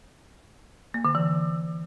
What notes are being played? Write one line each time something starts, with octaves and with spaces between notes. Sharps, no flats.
A#3
D3
E3